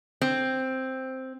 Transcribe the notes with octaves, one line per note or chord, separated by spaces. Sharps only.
C4